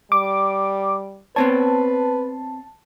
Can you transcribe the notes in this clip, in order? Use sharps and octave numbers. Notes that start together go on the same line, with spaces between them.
G3 D6
B3 C4 B4 C#5 A5